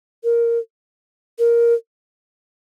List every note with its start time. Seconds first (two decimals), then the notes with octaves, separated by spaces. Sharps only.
0.24 A#4
1.39 A#4